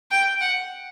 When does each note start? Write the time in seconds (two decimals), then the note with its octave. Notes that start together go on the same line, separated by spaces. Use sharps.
0.11 G5
0.41 F#5